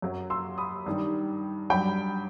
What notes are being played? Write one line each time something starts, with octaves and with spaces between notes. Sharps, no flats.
F#2 F#3
C6 E6
B5 D#6
G2 D#3 G3
G2 F#3 G5 B5